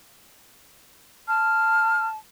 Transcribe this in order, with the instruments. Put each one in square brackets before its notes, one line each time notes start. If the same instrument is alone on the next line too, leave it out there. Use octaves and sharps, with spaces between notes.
[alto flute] A5 [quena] F6